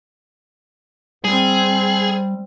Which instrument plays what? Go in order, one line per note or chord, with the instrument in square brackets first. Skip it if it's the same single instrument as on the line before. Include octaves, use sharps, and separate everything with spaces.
[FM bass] G3 [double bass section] C4 [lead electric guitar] G#4